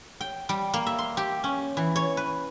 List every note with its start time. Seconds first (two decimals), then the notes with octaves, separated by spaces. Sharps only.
0.21 G5
0.49 G3
0.74 A#3
0.86 E5
0.98 C6
1.17 G4
1.44 C#4
1.77 E3
1.96 C#5
2.17 B4